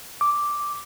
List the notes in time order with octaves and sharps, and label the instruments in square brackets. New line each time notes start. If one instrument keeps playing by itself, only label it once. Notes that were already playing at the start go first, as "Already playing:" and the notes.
[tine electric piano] D6